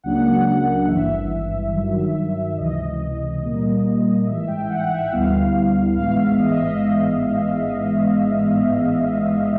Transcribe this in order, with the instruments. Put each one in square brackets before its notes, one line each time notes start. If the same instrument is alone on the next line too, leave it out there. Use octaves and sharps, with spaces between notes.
[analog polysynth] C#2 C#3 F#3 A#3 D4 F#5
F#5
F#5
F#5
G#1 G2 E3 E5
G2 D#3 F#3
C#2 C3 E3 D#5
A#2 G3 A#3
A1 G#2 E3 E5
G5
F#5
E5
D2 D3 G3 B3 E4 F5
A1 G#2 E3 G#3 B3 F5
E5
F5
D#5
E5
D#5